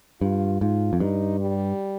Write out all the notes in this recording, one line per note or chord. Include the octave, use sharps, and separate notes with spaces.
G2 F4
G#2 F4
F2
G2 D#4
G3